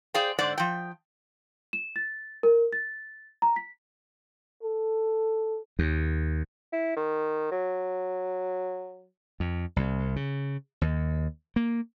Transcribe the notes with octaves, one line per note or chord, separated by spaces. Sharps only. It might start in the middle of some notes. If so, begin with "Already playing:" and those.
G#4 C5 D5 F5 G5
G#2 D3 C5 D5 F#5
F3 G5
E7
A6
A#4
A6
A#5
B6
A4
D#2
E4
D#3
F#3
F2
C2
C#3
D#2
A#3